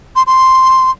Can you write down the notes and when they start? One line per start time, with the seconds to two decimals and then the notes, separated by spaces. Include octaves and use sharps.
0.16 C6
0.27 C6